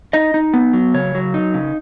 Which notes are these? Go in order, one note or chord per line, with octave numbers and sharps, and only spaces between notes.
D#4 D#5
D#4
B3
F#3
C#3 C#5
F#3
D#4
C#3